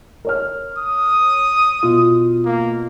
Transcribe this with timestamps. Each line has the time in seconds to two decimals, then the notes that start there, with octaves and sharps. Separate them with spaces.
0.25 A#4 C#5 F6
0.78 D#6
1.83 B2 F4
2.45 A#3